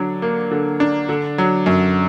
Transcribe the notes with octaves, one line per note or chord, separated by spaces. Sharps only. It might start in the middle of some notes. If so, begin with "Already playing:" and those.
Already playing: D3 F#3 D4
A#3
D3
D4
D3
F#3
F#2